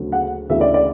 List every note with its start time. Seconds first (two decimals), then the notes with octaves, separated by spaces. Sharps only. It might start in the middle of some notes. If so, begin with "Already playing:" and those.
Already playing: D2 C#3 F#3 A3
0.12 F#5
0.49 D2 C#3 E3 A3 E5
0.61 D5
0.74 D5